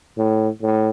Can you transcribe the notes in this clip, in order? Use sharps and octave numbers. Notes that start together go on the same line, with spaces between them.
A2
A2